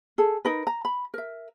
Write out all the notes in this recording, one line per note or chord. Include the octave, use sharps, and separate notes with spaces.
G#4 A4
D#4 A#4 B4
A#5
B5
A#4 E5